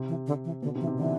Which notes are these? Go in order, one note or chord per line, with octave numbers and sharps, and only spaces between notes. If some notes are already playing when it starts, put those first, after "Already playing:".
Already playing: C3
E3
D3
E3
B2 D3
C3
E3
C3
D3 E3